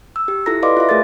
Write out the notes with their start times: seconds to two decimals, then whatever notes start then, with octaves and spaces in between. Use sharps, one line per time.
0.16 E6
0.28 G4
0.46 E4 F4 G4 A4 A#5 A#6
0.63 B4 D5 D#5 F5 C6 D6
0.77 F4 E5 F5
0.89 A3 G#4 A#4 A6